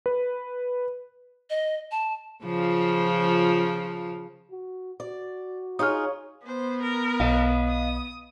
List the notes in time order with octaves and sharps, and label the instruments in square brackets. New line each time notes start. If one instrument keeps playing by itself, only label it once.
[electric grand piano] B4
[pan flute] D#5
A5
[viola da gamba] C#3 F3 F4
[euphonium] F#4
[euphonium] F#4 [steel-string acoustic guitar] D5
[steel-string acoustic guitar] D#4 F4 G#4 [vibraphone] C#5 F5 C#6 [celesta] D#6 F6
[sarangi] B3 [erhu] C5
[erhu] A#4
[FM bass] B1 [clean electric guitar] D#5 F5
[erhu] D#6